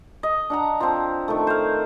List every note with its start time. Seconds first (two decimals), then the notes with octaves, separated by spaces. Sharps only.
0.23 D#5
0.50 D4 F#5 A#5
0.80 F3 C4
1.28 D#3 A3
1.47 C5 F5